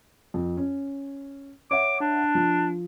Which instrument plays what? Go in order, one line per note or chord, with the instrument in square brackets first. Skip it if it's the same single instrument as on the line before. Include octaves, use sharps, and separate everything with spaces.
[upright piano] F2
C#4
[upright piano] C#5 E5 F#5 [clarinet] D6
[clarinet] D4
[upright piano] F3